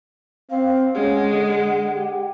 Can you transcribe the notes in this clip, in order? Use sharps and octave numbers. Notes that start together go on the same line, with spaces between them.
C4 F5
G#3 C#4 F#5
D3
G4